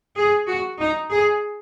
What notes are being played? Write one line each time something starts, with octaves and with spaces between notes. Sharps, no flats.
G#4
F#4
D#4
G#4